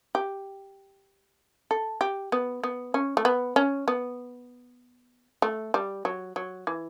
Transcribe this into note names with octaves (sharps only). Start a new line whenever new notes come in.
G4
A4
G4
B3
B3
C#4
A3
B3
C#4
B3
A3
G3
F#3
F#3
E3